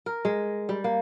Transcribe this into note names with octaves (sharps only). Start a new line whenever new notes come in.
A#4
G#3
G3
A#3